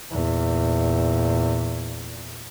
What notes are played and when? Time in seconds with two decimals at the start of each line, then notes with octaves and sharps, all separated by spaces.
0.11 E2 A#2